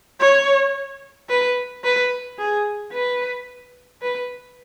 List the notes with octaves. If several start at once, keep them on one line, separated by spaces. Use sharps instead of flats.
C#5
B4
B4
G#4
B4
B4